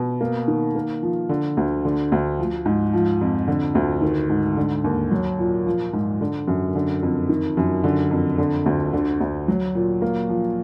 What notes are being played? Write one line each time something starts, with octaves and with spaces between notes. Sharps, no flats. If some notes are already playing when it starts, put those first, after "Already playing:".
Already playing: B2
A#3
D#3
A#3
F3
D3
D2
D3
D2
F3
G#2
F3
F2
D3
D2
D#3
G#2
D3
D#2
F#3
A#2
F3
G#2
D3
F#2
D3
F2
D#3
F#2
D3
F2
D3
D2
D3
D2
F#3
A#2
A#3
F3